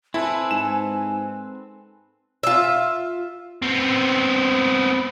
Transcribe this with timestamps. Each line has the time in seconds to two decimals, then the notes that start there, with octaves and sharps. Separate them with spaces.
0.14 C4 E4 A4 B4 G#5
0.51 G#2 E7
2.43 F4 E5
3.63 B3 C4